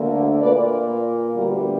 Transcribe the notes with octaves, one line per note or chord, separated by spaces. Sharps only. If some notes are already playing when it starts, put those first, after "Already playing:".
Already playing: D2 D3 A#3
A#2 A#3 B4 D5
D2 D3 G3 B3 F#4 A#4